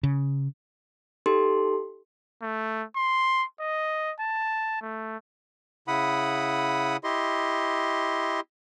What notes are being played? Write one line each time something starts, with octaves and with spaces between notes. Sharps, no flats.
C#3
D#4 G4 A4 C6
A3
C6
D#5
A5
A3
C#3 E4 F#5 B5 D#6
E4 G4 D#5 C6